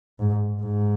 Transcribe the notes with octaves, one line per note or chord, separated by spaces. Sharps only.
G#2
G#2